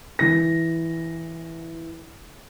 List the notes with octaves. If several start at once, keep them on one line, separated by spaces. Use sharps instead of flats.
E3 A#6